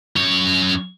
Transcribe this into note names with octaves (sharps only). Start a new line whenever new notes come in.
F#2 C#5